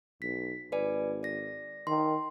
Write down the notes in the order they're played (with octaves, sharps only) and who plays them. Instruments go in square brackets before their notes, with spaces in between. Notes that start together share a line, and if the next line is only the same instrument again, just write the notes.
[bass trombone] B1 [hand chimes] B6
[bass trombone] G#1 [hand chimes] B4 D5 G#5
[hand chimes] D5 A#6
[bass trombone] D#3 [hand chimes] C6